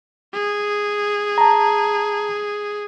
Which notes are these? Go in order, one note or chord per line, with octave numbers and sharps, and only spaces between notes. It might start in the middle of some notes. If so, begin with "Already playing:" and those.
G#4
A5 A#5